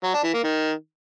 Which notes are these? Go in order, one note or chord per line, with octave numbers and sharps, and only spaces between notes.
F#3
D4
E3
A#3
D#3